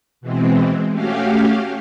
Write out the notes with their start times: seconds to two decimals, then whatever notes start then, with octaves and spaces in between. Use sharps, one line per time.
0.21 B2 E3 G#3 C4
0.90 A3 C#4 F#4 G4 F5